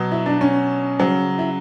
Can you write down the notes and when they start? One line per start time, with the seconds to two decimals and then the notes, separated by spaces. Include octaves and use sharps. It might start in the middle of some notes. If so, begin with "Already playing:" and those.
Already playing: B2 F#3
0.11 E4
0.26 D4
0.41 C#4
0.99 C#3 F#3
1.39 E4